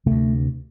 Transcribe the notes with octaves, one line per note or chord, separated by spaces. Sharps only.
D2 C3 A3